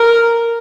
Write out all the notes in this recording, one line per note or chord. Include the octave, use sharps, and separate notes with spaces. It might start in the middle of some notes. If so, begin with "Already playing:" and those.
Already playing: A#4